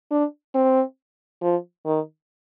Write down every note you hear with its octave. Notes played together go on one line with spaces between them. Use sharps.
D4
C4
F3
D#3